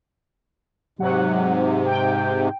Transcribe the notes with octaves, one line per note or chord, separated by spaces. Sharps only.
G#2 C3 F#3 F#5
G5